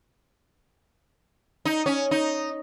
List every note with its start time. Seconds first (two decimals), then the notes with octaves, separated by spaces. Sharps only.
1.65 D#4
1.86 C#4
2.11 D#4